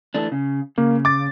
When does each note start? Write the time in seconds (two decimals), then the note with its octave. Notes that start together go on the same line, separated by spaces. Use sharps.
0.14 E3 A3 D4
0.32 C#3
0.78 C#3 A#3
1.05 D6 A6